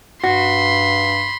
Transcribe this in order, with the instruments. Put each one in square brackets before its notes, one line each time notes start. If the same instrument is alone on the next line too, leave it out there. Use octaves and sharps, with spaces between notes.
[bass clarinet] G2 [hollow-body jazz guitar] F#4 [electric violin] B5 C6